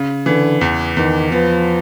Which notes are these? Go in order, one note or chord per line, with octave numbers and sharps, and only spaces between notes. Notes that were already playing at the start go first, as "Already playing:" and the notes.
Already playing: C#3
D3 E3
E2
E2 D#3
F3 B3